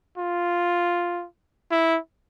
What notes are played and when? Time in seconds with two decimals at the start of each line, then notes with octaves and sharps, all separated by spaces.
0.18 F4
1.71 E4